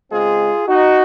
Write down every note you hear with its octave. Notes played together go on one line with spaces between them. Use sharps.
C#3 G#3 C4 F4 G#4
D#4 F#4